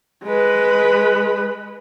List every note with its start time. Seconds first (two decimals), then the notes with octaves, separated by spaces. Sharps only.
0.25 G#3 B4